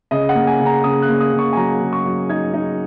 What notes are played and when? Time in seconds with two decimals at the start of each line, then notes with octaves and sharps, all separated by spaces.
0.11 C#3 D#5
0.29 F#5
0.35 A#3
0.47 G#5
0.60 C#3
0.66 A#5
0.84 C#3 D#6
1.02 F#6
1.09 A#3
1.20 D#6
1.33 C#3
1.39 C#6
1.53 G#5
1.57 F#3 A#5
1.81 C#3
1.93 C#6
2.05 F#3
2.29 D#4 G#6
2.54 D#4